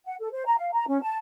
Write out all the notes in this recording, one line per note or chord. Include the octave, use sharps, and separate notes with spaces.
F#5
A4
C5
A#5
F5
A#5
C#4
A5